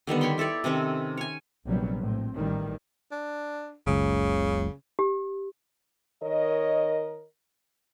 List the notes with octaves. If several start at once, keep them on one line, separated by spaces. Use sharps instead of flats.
D3 D#3 G3 B3
C#5 G5 B5 C6
E4 A4 C#5 D5
C3 D#3 C4 C#4
C#5 G#5
A#1 C3 F#3 G3 B3
A2 C4
A1 A2 D#3 G3
D4
F#1 C#2 C#3
G4
D#3 A#4 C#5 D#5